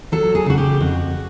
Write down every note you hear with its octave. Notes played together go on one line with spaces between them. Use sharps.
F#3 A4
G#4
C#3 F#4
G4
F2 F#4